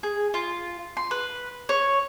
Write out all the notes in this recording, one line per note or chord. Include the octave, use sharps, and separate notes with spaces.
G#4
F4
C6
B4
C#5